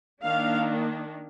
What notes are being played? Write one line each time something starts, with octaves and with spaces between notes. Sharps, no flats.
D#3 A#3 D4 F5